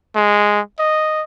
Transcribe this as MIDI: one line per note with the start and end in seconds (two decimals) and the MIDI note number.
0.16 0.60 56
0.79 1.23 75